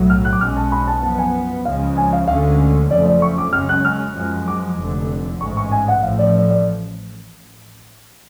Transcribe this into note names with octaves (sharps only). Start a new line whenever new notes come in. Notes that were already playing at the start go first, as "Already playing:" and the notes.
Already playing: B1 A2 F#3
F6
F#6
D6
B1 B2 G#3 C#4 F6
A5
B5
A5
F#2 F3 B3 A5
G#5
C#2 C#3 F3 G#3 F5
G#5
F5
D2 D3 G#3 C#4 F5
F#1 F2 C#3 F3 A3 D5
D5
C#6
D6
F#2 C#3 G#3 C#4 F6
F#6
F6
F#2 F3 G#3
D6
F1 F2 D3
A1 G#2 G#3 C#6
C#6
G#5
F#5
A1 A2 F3 F5
D5
D5
D5